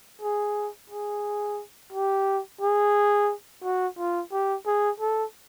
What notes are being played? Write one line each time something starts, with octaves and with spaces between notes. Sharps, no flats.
G#4
G#4
G4
G#4
F#4
F4
G4
G#4
A4